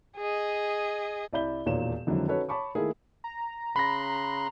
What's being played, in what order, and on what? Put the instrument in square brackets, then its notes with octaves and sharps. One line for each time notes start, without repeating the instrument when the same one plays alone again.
[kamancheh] G#4 D#5
[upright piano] C2 D5 E5 B5 G6 G7
E1 D#2 A#2 C#5 D5 E7
F2 D3 D#3 F#3 G#3 E4
C#4 D#4 F#4 A4 B4 C#5
C#5 A5 B5 C#6 D6
D#3 A3 A#3 E4 G#4 A#4
[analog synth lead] A#5
[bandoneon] C#3 C6 F#6 [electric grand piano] B5 A#6